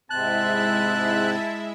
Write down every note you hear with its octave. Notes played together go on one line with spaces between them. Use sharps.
G#2 C3 G#3 C4 E4 E5 A5 F#6